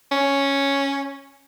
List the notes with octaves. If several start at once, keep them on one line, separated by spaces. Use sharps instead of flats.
C#4